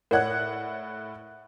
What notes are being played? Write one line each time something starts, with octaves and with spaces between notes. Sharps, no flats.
A2 A#4 C#5 D5 F#5 F#6